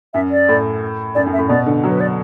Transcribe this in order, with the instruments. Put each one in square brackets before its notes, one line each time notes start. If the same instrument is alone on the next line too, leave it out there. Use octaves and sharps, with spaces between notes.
[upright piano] F#2 [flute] E5
[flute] D5
[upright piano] A2
[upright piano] F#2 [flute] D5
[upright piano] F#2
[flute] E5
[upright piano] A2
[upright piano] B2 [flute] D5
[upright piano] D3
F#3
[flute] B4
D5